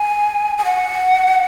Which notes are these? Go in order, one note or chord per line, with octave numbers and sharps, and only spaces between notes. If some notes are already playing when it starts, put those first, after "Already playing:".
Already playing: G#5
G#5
F#5